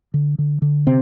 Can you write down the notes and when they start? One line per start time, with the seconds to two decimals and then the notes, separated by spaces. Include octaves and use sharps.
0.14 D3
0.39 D3
0.62 D3
0.87 C3 C4